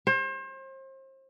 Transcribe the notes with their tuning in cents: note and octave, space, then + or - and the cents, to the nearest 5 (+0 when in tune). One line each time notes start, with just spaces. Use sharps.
C5 +35